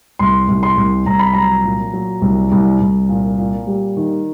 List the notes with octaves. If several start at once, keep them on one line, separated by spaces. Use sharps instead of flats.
C2 C6
C2
C6
C2
C2 A#5
B5
F#3 A#5
A#2
F#3
C2
C2
C2
A#2
A#2
G3
D#3